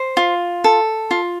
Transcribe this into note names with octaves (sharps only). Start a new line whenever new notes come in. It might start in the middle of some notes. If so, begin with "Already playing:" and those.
Already playing: C5
F4
A4
F4